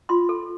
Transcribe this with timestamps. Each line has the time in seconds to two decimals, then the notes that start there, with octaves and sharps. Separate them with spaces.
0.09 F4 C6
0.29 A4